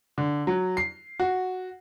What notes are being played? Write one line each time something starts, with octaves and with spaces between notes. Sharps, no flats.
D3
F#3
C7
F#4